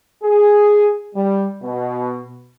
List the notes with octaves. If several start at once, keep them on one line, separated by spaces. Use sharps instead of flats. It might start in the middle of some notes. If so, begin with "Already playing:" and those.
G#4
G3
B2